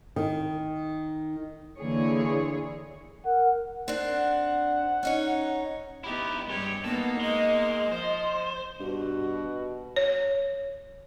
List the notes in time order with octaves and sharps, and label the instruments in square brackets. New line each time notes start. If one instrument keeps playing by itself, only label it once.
[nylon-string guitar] D#3
[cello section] D3 E3 A#3 G#4 C#5
[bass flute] A#4 [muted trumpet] F#5
[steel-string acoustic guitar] C4 D4 [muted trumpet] F#5
[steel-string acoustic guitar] C#4 D#4 C#5
[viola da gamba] B3 G4 [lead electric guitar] D#4 E4
[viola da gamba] G2 C#5 [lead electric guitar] G#3 G4
[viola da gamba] A#3 D#4 [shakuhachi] B3 [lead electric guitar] A4
[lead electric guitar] G#3 [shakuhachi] D#5
[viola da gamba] F3 [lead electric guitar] C5
[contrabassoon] G2 [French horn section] B2 F#4
[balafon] C#5